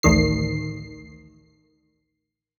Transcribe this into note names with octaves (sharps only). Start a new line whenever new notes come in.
A1 D2 D#3 C7